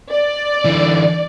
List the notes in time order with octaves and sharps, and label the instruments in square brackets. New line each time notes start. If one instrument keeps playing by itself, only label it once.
[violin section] D5
[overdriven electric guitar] D3 E3